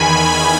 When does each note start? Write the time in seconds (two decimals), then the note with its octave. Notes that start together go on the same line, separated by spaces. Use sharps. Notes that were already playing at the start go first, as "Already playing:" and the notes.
Already playing: E2 D#3 G#5 B5